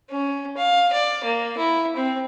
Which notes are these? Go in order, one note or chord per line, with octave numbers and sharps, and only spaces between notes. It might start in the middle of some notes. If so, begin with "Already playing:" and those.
C#4
F5
D5
A#3
E4
C4